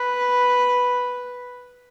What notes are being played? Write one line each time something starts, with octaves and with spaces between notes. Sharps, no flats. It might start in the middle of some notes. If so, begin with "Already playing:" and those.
Already playing: B4